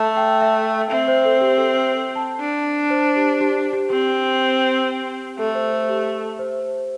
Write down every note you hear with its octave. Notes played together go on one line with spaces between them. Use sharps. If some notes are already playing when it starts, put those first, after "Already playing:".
Already playing: A3 A5
G5
E5
C4 E5
C5
A4
G4
A4
C5
A5
D4
C5
G4
G4
G4
C4 G4
A3 A4
C5
A4
G4
C5